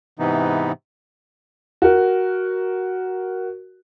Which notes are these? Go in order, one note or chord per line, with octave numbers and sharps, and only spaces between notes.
G#2 C3 E3 B3 D#4
F#4 A#4